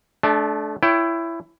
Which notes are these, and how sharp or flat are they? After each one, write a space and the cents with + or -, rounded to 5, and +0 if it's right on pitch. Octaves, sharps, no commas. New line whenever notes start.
A3 -30 D4 +0
E4 +15 C#5 +20 G5 +0